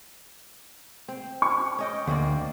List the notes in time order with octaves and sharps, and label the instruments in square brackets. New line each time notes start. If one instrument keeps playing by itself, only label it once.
[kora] C4
[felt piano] C#6
[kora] C#4 D#5 G5
[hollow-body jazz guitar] D2 [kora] A#3 C4 D5